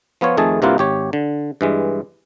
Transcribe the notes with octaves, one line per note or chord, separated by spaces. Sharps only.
F3 B3 F4 C#5
F2 D#3 A3 G#4 A5
G2 C3 A#3 E4 F4 F#5
G#1 G4 C#5
D3
G2 E3 G#3